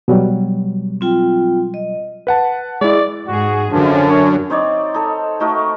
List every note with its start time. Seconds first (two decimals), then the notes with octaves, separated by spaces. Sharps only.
0.08 B2 F#3 G3
1.01 C4 F4 G5
1.74 D#5
2.27 B4 F#5 A5
2.81 G#3 E4 D5
3.27 G#2 F#4 G#4
3.72 F#2 D3 F3 D4
4.09 C#5
4.50 C4 D#4 C#5 D5
4.94 D#4 A4
5.40 A3 D#4 F#4 A#4